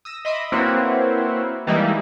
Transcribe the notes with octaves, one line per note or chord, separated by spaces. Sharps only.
D#6 E6 A#6
D#5 E5 B5 C6 D6 D#6
A#3 C4 E4 F#4 B4 C#5
E3 G3 G#3 A#3 D#4 E4